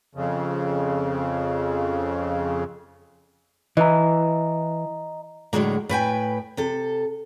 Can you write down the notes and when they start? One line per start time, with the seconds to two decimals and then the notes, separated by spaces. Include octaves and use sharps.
0.15 F2 C#3
3.77 E3 D#5 A#5
5.53 A2 D3 F#3 G#3 A#3
5.89 A2 B4 G5 G#5
6.57 C3 A4